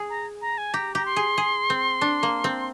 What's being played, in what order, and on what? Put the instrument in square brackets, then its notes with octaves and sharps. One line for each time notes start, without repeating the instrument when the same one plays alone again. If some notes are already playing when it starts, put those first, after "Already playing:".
Already playing: [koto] G#4
[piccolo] A#5
A#5
G#5
[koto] G4 [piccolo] A#5
[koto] G4 [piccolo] A#5
[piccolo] C6
[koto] G#4
G#4
C4
D4
A#3
C4